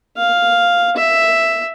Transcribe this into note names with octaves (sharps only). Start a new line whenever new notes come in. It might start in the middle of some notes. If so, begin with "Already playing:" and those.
F5
E5